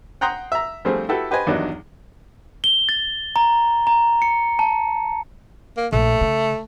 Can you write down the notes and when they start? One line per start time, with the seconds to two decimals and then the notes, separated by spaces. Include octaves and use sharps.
0.21 F#5 G5 A#5 C6 D#6 F#6
0.52 E5 A#5
0.85 F3 G3 A3 C4 D4 G#4
1.09 E4 F#4 G4 A4 B4
1.31 G4 B4 C5 D#5 G#5
1.47 E2 G2 D#3 F#3 D4 D#4
2.64 G7
2.89 A6
3.36 A#5
3.87 A#5
4.22 C#7
4.59 A5
5.77 A#3
5.92 A#1 A3
6.21 C#3